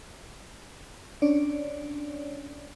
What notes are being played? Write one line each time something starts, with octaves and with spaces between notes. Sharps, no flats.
C#4 D4 C#5 D5